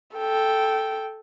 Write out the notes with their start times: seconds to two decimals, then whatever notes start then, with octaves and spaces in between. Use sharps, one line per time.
0.16 A4 G5